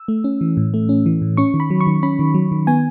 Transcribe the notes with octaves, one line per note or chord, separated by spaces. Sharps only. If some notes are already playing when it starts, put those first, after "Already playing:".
Already playing: E6
A3
C#4
E3
A2
A3
C#4
E3
A2
C#4 C#6
D#3
B5
F#3
C#6
D#3
C#4 B5
D#3
F#3
D#3
B3 G#5